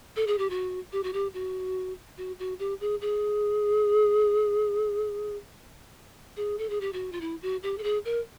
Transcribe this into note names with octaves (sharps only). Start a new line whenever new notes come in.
A4
G#4
G4
F#4
G4
F#4
G4
F#4
F#4
F#4
G4
G#4
G#4
G#4
A4
G#4
G4
F#4
F4
E4
F#4
G4
A4
G#4
A#4